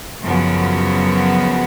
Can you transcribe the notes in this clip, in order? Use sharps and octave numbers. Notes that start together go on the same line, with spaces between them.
F#2 C#3 F3 B3 F#4